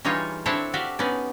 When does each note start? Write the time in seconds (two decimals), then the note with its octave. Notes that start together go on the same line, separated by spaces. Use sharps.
0.04 E3 G3 D#4 F4 G#4 C#5
0.46 C4 D4 E4 A4 C5 C#5
0.74 F#4 G4 D5 E5 F5 G5
0.99 B3 C#4 D#4 D5